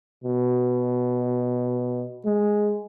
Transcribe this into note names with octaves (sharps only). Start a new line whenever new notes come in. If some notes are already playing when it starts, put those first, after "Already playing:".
B2
G#3